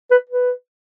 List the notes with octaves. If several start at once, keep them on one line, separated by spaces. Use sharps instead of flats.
B4
B4